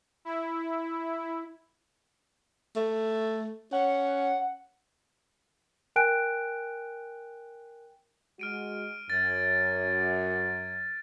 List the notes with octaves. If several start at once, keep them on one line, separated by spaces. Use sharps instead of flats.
E4
A3
C#4 F#5
A#4 G5 G#5 F#6 D7
G#3 F#4 F6 D7 D#7
F#2 G#6 A6